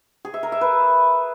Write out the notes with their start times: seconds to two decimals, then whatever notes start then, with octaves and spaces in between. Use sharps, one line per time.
0.25 G#4
0.34 E5
0.43 A#4
0.52 E5
0.61 B4